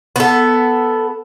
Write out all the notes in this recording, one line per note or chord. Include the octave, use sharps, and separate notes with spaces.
B3 A4